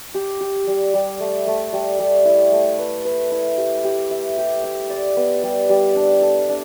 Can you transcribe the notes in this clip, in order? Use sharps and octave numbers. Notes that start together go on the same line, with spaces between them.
G4
G4
G3
G3
A3
A3
G3
G3
E4
A3
B4
B4
E4
G4
G4
E5
G4
E5
D5
B3
G3
G3
D4
A4
D4